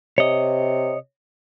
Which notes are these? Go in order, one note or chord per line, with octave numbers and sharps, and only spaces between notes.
C3 C#5 D#5